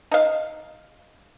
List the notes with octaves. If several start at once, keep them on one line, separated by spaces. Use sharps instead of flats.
D#4 F5